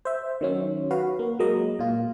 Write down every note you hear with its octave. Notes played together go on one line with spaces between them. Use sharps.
C5 E5
D#3 F#3 C#4
F#4 B4 F5
A#3
F#3 G#3 A#3 A#4 D#5
A#2 F4